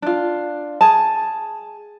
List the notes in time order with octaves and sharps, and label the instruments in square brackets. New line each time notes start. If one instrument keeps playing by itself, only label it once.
[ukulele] D4 F4
G#4 A5